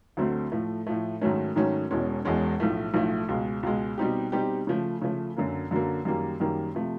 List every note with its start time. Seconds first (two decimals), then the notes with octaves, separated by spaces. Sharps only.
0.17 D2 D3 F#3 A3 C4
0.52 A2 F3 A3
0.87 A2 F3 A3
1.21 G#2 D#3 F#3 A3 C#4
1.56 G#2 D#3 F#3 A3 C#4
1.91 E1 E2 B2 G#3 C#4
2.25 E1 E2 B2 G#3 C#4
2.60 B1 A2 F3 A3
2.94 B1 A2 F3 A3
3.29 C#2 B2 G#3
3.63 C#2 B2 G#3
3.98 B2 G3 C4 D#4 G4
4.32 B2 G3 C4 D#4 G4
4.67 C#3 F3 A3
5.02 C#3 F3 A3
5.36 F#2 D3 F#3 A#3
5.71 F#2 D3 F#3 A#3
6.05 F#2 D#3 G3 A#3
6.40 F#2 D#3 G3 A#3
6.75 C3 F3 A3